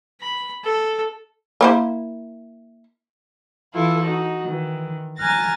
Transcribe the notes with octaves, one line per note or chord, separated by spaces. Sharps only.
B5
A4
A#3 E4 C5
E3 E4 F4 A4
D#4 F#4
D#3 E3
G#5 A#5 F6 F#6 A6 A#6